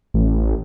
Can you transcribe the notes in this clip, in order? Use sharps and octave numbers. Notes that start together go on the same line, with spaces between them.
A1